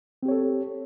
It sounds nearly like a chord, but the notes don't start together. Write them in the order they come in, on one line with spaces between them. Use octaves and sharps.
C4 G4 C#5 A4